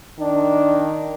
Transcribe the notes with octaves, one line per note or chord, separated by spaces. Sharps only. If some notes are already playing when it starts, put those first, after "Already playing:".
D#3 D4